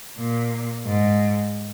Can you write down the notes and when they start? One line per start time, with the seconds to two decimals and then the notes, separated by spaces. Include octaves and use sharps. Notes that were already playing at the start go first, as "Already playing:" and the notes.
0.18 A#2
0.86 G#2